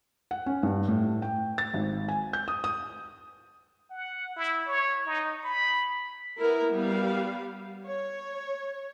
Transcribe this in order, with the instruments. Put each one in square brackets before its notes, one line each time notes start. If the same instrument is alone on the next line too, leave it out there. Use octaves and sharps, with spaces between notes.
[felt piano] F#5
C#4
G2
A2
G5
A6
G#1
G#5
G6
D#6
D#6
[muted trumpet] F#5
E4
C#5
D#4
B5
[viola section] B3 E4 A#4
G3 B3 F5
C#5